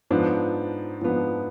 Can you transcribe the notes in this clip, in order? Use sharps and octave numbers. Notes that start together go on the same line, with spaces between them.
G#2 F3 B3 D4
G#2 F3 B3 D4